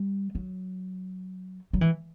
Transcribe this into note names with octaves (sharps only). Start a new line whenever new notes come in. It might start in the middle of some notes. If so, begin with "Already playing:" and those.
Already playing: G3
F#3
F#3
E3